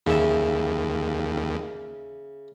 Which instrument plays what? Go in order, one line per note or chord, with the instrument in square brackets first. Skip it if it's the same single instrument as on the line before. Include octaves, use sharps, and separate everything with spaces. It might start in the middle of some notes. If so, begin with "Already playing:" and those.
[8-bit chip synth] D#2 [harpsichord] C#3 E5